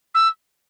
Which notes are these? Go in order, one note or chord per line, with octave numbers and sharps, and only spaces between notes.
E6